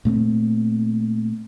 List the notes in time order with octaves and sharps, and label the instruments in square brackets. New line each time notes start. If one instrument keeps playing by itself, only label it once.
[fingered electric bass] A#2 A3 B3 C4